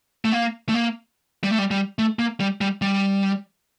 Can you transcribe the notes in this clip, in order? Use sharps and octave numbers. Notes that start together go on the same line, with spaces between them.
A3
A#3
A3
A#3
G3
A3
G3
G3
A3
A#3
G3
G3
G3